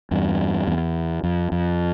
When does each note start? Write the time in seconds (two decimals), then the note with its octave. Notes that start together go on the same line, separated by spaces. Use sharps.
0.11 E2 G2
0.67 E2
1.23 F2
1.52 F2